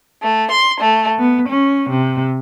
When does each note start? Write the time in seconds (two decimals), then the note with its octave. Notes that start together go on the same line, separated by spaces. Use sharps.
0.21 A3
0.50 C6
0.80 A3
1.18 B3
1.49 C#4
1.90 C3